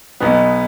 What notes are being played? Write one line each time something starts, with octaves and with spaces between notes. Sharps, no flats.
B1 B2 B3